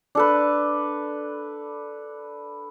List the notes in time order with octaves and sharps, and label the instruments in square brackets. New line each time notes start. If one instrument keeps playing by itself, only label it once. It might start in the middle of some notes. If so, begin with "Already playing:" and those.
[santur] D4 A4 B4